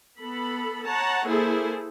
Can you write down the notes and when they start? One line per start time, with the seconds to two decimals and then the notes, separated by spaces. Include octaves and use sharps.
0.19 B3 A4 B5
0.85 C#5 F#5 A5 A#5
1.26 A#3 E4 G#4 A4 C5